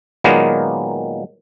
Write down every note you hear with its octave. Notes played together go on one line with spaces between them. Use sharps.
A#2 D#3 F#3 G#3 A#3 B3